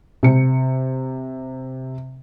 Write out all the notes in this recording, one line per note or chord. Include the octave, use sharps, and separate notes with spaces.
C3 C#7